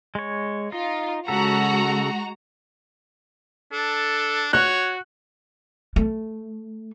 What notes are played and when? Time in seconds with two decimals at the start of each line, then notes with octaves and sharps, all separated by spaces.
0.15 G#3 C#5
0.72 D#4 F4
1.28 C#3 G#3 F#4 A4 A#5
3.72 D4 A4
4.53 F#4 C#5 F#6
5.96 A3